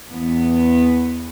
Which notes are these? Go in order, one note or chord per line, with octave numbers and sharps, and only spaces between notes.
E2 B3